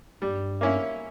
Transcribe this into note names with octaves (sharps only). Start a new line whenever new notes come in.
G2 G3
A#3 C#4 E4